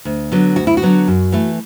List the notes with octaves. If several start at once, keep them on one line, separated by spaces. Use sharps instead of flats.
D2
D3 F#3 B3
D2 F#4
E4
F#4
D3 F#3 B3
F#2
E3 A3